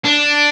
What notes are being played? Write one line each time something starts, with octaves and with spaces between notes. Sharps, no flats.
D4